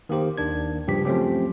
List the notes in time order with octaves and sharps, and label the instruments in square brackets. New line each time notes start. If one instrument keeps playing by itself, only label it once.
[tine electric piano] D#3 A#3 G4 C5
D#2 D#3 D4 G#6
G2 C#3 F3 G4 B6
F3 F#3 A3 C4 C#4 G4